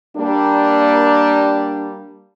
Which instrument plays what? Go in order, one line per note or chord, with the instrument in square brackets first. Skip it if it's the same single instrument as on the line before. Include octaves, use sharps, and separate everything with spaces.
[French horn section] G3 A#3 D4